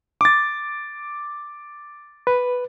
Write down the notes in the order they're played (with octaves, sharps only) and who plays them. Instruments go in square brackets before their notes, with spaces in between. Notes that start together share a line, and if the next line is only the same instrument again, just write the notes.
[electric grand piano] D6 A6
[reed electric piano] B4